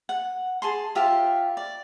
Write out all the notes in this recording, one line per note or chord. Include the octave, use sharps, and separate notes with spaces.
F#5
G#4 A5 C6
F4 G4 C5 E5
D5